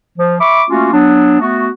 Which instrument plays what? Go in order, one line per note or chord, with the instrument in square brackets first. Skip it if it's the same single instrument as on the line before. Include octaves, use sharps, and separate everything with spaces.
[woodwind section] F3
E5 B5 C#6 D6
A3 A#3 C#4 F4 F#4
F#3 B3 D4
A3 B3 F#4